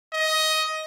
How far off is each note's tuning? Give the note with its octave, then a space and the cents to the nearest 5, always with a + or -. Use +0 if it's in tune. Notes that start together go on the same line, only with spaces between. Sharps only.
D#5 +15